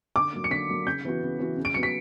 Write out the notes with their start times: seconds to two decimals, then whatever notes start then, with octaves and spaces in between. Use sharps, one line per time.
0.16 D3 D6
0.33 F#3 A#3
0.44 C#7
0.51 D3 B6
0.69 F#3 A#3
0.86 C#3 G6
1.05 E3 B3 F#4
1.22 C#3
1.39 E3 B3 F#4
1.58 C#3
1.65 D7
1.74 F#3 B3 F#4 C#7
1.83 B6